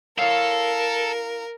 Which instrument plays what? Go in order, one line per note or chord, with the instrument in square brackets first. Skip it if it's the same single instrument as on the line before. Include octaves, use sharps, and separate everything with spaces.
[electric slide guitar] E4 C#5 F5 [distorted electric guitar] A4 [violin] A#4